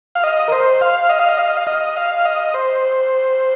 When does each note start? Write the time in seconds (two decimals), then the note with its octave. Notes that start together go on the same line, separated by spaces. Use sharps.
0.15 F5
0.23 D#5
0.48 A#4
0.52 C5
0.81 F5
1.09 D#5
1.19 F5
1.29 D#5
1.38 F5
1.47 D#5
1.57 F5
1.67 D#5
1.96 F5
2.25 D#5
2.54 C5